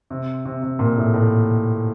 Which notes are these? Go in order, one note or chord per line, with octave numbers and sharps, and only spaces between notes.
C3
C3
C3
A#2
A2
A2